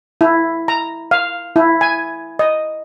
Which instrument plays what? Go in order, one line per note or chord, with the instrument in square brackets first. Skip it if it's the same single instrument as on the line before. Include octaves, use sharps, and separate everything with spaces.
[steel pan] E4
A#5
F5
E4
G#5
D#5